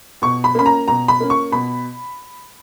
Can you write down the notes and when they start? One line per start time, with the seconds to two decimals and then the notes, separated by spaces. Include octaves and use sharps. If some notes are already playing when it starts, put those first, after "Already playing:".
0.22 B2 C#6
0.44 B5
0.55 A#3 C#4 B5
0.66 A#5
0.88 B2 A#5
1.08 B5
1.20 A#3 C#4
1.30 C#6
1.52 B2 B5